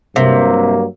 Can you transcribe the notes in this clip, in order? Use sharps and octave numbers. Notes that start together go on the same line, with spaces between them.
G2 C3 F#3 A#3